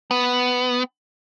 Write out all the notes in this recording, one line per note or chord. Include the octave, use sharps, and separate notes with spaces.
B3